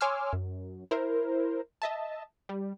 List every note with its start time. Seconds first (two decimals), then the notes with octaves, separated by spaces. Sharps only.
0.01 C#5 G#5 C6 D6 E6 F6
0.33 F#2
0.91 E4 A#4 C5
1.82 D#5 E5 A5
2.49 G3